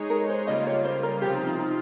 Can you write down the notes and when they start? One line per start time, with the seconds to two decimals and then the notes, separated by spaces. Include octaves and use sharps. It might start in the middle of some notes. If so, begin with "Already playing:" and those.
Already playing: G#3 D#4 G#4 C#5
0.10 A#4
0.29 C5
0.47 C#3 G3 A#3 F4 D#5
0.67 C#5
0.85 C5
1.03 A#4
1.21 C3 F3 C4 F4 G4
1.35 D#4
1.47 D#4
1.59 D#4